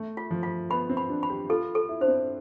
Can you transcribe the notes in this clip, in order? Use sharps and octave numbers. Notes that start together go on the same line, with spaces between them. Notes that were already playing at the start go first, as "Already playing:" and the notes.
Already playing: A3
F4
F3
F4
B3 B5
C4
B5
D4
B5
G4
F4 A4
A4
E4
D4 C5
C4